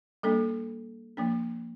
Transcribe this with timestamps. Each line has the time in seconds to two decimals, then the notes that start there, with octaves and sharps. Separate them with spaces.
0.23 G3 A#3 D4 A4
1.17 F3 A#3 D4